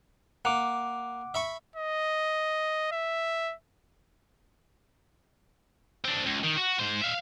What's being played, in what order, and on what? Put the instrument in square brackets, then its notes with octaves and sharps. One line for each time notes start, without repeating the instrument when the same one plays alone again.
[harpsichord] A#3 [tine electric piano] F#5 D6
[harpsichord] E5 B5 C#6
[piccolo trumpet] D#5
E5
[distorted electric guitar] C4 D4
C#2
D#3
F#4
G#2 C5
E5 F5